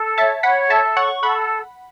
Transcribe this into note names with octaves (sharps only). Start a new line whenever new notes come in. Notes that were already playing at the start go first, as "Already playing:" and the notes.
Already playing: A4
C#5 E5 A5
C#5 F#5 B5
A4 E5 A5
C#5 F#5 C#6
A4 F#5 B5